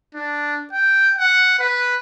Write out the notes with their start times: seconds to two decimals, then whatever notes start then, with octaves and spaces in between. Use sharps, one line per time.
0.14 D4
0.73 G5
1.18 F#5
1.59 B4